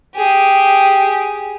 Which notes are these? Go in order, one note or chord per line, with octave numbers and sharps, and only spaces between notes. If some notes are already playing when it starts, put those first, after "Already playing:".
G4 G#4